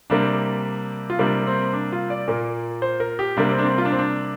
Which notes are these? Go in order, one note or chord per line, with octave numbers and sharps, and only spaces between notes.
C3 G3 A#3 D4
F4
C3 G3 A#3 D4
C4
D4
F4
D5
A#2 A#3
C5
A#4
G4
C3 G3 A#3 D4
C4
D4
C4
F4
D4
C4
D4